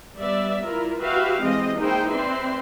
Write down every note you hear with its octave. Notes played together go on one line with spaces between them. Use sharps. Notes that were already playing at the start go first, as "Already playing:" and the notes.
G3 B3 D5 E5
E4 F4 A#4
F#4 G4 B4 E5 F5
E3 G#3 C4 D#5
A#3 D#4 E4 G#4 C5 G5
C4 B4 D5 E5 C6